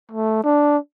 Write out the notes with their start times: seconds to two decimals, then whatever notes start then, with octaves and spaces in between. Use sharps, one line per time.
0.11 A3
0.43 D4